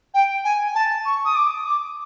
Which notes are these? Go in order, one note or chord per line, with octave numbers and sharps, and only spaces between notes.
G5
G#5
A5
C#6
D#6
D6
D6